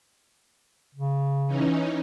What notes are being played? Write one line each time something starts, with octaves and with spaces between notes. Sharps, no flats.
C#3
E3 C#4 D#4